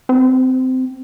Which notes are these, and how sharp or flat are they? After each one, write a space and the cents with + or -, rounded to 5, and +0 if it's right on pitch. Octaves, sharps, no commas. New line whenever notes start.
C4 -20